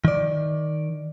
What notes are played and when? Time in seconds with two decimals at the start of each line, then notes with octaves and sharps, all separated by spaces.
0.05 D#3 D5